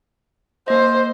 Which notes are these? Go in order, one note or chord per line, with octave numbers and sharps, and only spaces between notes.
A#3 C5 D#5